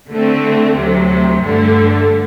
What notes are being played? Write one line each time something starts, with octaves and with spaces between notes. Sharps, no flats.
D3 A3 C4
D2 C3 F#3
G2 D3 A3